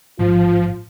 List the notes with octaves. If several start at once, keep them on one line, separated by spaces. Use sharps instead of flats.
A1 G#2 F3 F4